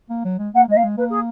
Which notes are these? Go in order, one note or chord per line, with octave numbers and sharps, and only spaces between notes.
A#3
F#3
G#3
A#3 F#5
G#3 D#5
A#3 F5
G#3
A#3 B4
G#4